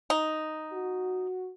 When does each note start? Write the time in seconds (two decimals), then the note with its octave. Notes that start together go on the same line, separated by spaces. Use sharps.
0.10 D#4
0.73 F#4